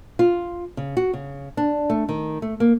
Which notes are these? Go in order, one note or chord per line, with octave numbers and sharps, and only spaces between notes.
F4
C#3
F#4
C#3
D4
A3
D#3
A3
A#3